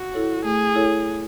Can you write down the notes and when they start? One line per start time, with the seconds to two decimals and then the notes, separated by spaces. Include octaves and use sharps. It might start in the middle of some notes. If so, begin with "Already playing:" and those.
Already playing: F#4
0.14 E4 A4 C#5
0.44 A3 G#4
0.75 E4 A4 C#5